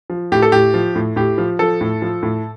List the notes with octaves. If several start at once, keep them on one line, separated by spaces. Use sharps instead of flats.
F3
A2 G4
A4
A2 G4
F3
A2
A2 G4
F3
F3 A4
A2
F3
A2